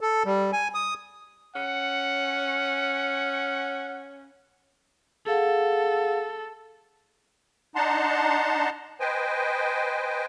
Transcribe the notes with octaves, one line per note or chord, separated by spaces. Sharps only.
A4
G3
G#5
D#6
C#4 F#5
G#4 A4 F5 F#5
D4 D#4 F#5 A5 A#5 C6
B4 C5 D#5 G5 G#5